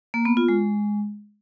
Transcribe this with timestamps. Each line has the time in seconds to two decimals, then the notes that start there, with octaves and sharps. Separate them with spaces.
0.14 A#3
0.25 B3
0.37 F4
0.48 G#3